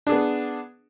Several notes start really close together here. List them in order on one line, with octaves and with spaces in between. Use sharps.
D4 G#4 B3